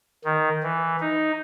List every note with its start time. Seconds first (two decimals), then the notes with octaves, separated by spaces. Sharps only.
0.25 D#3
0.63 E3
1.00 D#4